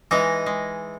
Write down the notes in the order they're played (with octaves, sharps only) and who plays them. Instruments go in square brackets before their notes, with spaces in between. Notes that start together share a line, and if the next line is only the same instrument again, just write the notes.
[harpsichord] E3 [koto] G#3 D#4
[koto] G#3